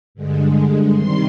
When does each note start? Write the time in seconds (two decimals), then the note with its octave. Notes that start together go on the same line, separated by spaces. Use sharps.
0.15 G2 D3 G#3
0.93 C3 D#3 G3 C6